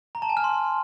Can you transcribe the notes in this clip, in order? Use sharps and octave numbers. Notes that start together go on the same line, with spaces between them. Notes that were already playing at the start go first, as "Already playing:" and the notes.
A#5
A5
G#5
F6
C6